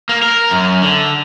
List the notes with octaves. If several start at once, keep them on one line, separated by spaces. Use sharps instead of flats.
A#3
A#4
F#2
D3